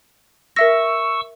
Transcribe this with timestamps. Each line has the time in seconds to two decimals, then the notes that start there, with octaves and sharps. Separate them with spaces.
0.56 A#4 E5 C#6 E6 A#6